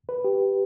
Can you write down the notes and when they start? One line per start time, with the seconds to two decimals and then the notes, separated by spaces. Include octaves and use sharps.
0.09 B4
0.24 G4